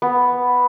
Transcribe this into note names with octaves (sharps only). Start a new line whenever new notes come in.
B3